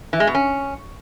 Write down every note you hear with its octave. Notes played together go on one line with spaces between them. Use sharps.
E3
G#3
B2
C#4